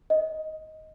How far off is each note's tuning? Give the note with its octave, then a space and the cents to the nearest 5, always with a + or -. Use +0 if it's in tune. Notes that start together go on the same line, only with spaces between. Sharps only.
D#5 +10